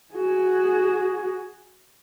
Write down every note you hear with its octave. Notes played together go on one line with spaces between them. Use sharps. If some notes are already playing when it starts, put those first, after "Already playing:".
F#4 G#4